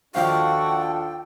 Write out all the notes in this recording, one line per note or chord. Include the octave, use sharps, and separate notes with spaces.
D#2 F3 D4 F4 F#4 A4 F5 G5